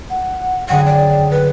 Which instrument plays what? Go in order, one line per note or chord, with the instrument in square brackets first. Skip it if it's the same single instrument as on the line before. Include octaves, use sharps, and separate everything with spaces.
[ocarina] F#5
[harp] F#2 D3 G#4 [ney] F#5 [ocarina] G5
[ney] D5
B4